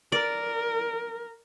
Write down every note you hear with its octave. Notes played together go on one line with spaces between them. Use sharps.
A#4 D5